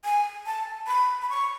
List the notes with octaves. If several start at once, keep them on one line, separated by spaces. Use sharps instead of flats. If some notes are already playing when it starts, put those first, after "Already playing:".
G#5
A5
B5
B5
C#6